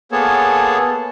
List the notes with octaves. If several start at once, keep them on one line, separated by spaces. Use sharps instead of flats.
A#3 B3 G#4 A4 C#5 A5